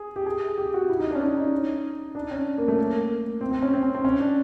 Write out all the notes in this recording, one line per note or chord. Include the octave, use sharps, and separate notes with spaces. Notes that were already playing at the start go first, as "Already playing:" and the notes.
Already playing: G#4
G4
G#4
G4
F#4
E4
D#4
D4
C#4
D4
D#4
D4
C#4
A#3
A3
A#3
C4
C4
C#4
C4
C#4
C4
C#4
D4